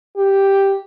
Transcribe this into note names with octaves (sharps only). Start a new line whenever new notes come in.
G4